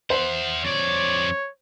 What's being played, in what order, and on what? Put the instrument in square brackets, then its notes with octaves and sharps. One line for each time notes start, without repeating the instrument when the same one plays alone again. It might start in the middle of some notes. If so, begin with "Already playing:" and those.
[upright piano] C5 [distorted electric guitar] E5 F#5
[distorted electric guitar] F2 D5 [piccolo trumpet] C#5